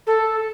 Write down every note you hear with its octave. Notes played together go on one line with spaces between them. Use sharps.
A4